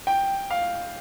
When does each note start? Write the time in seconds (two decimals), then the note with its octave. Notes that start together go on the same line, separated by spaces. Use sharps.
0.07 G5
0.51 F5